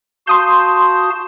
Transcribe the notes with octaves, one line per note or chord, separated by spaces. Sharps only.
F#4 F5 A5 C6 D#6 G6